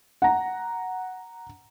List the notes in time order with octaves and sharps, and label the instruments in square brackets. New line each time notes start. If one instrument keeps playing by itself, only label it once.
[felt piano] F#5 A#5